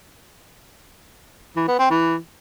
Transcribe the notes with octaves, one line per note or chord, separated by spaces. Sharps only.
E3
B3
C4
E3